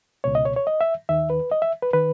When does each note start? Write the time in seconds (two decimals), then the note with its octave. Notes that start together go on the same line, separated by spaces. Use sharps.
0.24 C#2 B2 C#5
0.35 D#5
0.45 C#5
0.56 C#5
0.67 D#5
0.81 E5
1.09 D#2 D#3 E5
1.30 B4
1.51 D#5
1.62 E5
1.83 B4
1.93 D#3 B4